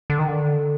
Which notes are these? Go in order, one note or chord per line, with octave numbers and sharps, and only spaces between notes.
D3
D#3
D3